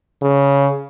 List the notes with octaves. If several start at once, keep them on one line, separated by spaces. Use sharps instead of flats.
C#3